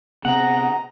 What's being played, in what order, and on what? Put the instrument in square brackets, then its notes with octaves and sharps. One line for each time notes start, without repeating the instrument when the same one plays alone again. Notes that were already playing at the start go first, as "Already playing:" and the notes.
[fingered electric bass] C3 B3 C4 [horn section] G#4 D#5 A#5 [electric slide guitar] F#5